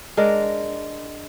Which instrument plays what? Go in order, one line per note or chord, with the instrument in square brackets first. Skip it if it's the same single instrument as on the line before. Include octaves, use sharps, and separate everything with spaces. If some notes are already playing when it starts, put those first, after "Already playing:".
[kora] G#3 D4 A#4 D5